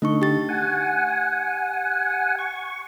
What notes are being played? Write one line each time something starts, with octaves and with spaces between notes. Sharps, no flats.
D3 A3 D#4 C#6
G4 A6
F#5 G#5
C#6